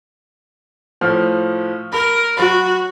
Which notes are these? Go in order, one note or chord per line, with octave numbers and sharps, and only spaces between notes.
A2 F3 F6
A#4 B5
F#3 F#4 B5